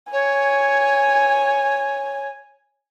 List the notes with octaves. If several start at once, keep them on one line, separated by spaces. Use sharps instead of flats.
C#5 G#5